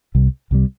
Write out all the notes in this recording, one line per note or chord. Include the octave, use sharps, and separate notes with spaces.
C2 C3 G3
C2 C3 G3